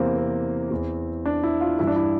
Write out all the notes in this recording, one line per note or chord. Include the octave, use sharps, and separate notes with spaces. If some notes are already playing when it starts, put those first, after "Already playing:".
Already playing: E2 C3 E3 A#3 C4
C4
E2 E3
D4
E4
F4
G2 E3 E4
D4
E4